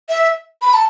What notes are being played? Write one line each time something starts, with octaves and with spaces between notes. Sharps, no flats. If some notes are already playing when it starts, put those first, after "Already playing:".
E5
B5
A5